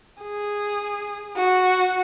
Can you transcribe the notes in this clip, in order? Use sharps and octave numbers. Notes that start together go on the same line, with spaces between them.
G#4
F#4